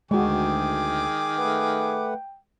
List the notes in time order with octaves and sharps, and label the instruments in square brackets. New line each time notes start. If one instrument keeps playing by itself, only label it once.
[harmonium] D2 [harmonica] D#3 G#4 D6 [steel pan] G#3 F#4 [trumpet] G5
[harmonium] A3 B4 F#5